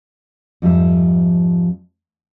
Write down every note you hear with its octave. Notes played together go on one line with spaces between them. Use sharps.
F2 G#2 F3 G3 E5